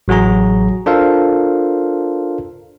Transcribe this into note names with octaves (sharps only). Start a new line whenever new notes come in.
A1 F#3 F#4 G#4 A#5
D4 F4 A4 A#4 C5 F5